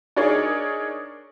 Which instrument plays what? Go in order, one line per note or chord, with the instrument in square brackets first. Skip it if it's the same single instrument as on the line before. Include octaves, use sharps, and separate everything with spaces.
[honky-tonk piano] D4 D#4 G#4 A#4 C#5 D5